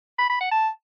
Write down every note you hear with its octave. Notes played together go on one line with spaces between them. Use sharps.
B5
B5
F#5
A5